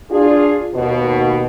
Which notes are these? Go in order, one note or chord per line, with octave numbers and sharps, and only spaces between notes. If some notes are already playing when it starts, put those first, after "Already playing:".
D4 F4 G#4
D#2 B2